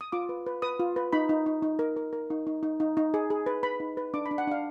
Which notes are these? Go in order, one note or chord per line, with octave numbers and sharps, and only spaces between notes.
D#6
F4 D6
B4
B4
B4 D#6
F4
B4
D#4 B5
D#4
D#4
D#4
A#4
A#4
A#4
D#4
D#4
D#4
D#4
D#4
G#4
G#4
B4
B4 B5
D#4
B4
D4 D6
B5
D4
F#5
D4 F5